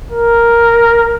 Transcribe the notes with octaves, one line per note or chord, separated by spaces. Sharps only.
A#4